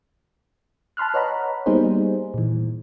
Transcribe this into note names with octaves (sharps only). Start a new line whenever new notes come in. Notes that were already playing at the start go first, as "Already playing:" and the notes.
A5 B5 C6 F6 F#6
B4 C#5 D#5 F#5 A#5 B5
G3 A#3 B3 D#4 G#4 C5
A#2 E3